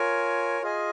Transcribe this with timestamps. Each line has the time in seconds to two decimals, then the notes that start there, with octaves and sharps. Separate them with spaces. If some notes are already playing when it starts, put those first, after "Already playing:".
Already playing: F4 A#4 C#5 G#5
0.62 F4 G#4 D#5 G#5